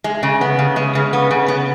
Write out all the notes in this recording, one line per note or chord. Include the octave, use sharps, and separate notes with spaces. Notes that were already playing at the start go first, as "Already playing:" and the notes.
G#3
C#3
B3
C#3
G#3
C#3
B3
C#3
B3